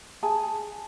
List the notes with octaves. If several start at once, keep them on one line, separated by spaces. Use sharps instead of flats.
G#4 G#5 A5